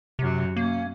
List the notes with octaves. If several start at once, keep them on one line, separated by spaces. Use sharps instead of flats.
F#2 C3 F#3
A#3 C#4